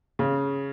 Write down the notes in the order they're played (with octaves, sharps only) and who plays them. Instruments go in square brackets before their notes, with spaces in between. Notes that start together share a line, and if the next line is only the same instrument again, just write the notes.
[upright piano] C#3